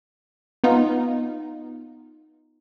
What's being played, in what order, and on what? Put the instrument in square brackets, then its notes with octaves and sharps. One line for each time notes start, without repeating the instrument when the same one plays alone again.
[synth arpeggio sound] B3 D#4 F4